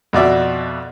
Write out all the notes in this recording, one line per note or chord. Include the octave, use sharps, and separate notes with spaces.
F2 B2 D5 E5